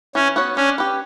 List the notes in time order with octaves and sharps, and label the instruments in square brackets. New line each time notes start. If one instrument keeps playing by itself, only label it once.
[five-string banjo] E3 [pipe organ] C#4
[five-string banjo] B3 F#4 C#5
[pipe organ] C#4 [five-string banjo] D4
[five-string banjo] G4 B4